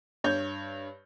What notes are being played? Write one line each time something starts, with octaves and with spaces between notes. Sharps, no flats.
G2 C#5 G6